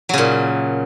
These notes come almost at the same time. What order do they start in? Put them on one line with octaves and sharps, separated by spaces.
F#3 C#3 A#2